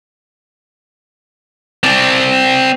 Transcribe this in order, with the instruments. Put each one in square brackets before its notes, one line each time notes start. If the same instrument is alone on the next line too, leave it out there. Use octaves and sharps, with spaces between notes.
[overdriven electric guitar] C4 D5